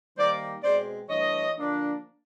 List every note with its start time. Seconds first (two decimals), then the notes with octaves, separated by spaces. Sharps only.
0.18 D#3 G3 A#3 C5 D5
0.63 B2 G#3 C4 C5 D5
1.09 G2 E3 A3 C#5 D#5
1.56 D3 F3 A#3 D4